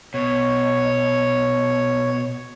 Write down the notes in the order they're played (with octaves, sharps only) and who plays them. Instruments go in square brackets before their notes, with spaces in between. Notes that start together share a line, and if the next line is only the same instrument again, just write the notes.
[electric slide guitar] B2 [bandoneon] C#5